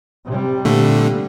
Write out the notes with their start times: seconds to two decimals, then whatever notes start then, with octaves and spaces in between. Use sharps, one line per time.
0.28 C3 G3
0.65 A#2 D3 A3